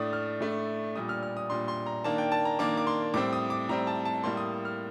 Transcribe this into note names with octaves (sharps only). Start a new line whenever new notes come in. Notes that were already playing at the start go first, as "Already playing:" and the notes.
Already playing: A2 A3 D4 D#6
F6
A2 A3 D4
A#2 G3 D4 D#6
F6
F6
D#6
A#2 G3 D4 C6
C6
A#5
D#3 A#3 D4 A5
G5
A5
A#5
D#3 A#3 D4 D6
D6
C6
A2 G3 C4 D6
D#6
D6
A2 G3 C4 A#5
A5
A5
A2 G3 A#3 C6
D#6
F6